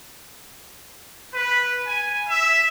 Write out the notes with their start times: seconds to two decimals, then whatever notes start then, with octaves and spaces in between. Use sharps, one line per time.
1.33 B4
1.86 G#5
2.29 E5